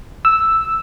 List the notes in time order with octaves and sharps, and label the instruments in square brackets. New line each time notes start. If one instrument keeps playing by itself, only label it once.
[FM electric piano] E6